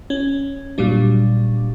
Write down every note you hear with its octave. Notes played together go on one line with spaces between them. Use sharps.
C#4
A#2 F#3 G3 D4